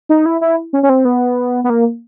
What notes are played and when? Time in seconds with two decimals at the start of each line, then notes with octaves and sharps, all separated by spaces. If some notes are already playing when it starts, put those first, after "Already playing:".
0.09 D#4
0.26 E4
0.41 E4
0.73 C#4
0.83 C#4
0.89 C4
1.05 B3
1.64 B3
1.70 A#3